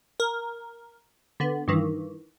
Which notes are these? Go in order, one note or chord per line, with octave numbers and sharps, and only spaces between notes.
A#4
D3 B3
G2 D#3 E3